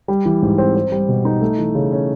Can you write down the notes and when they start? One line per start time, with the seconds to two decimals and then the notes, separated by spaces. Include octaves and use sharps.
0.08 G3
0.26 E3
0.43 G#2
0.58 C4
0.75 C4
0.92 G3
1.09 B2
1.25 D#4
1.41 A3
1.59 E3
1.75 C#3
1.92 C#4